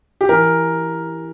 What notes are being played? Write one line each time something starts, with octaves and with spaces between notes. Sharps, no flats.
G4
E3 A#4